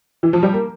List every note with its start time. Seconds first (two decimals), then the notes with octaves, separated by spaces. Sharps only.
0.23 E3
0.33 F3
0.43 G3
0.53 A#3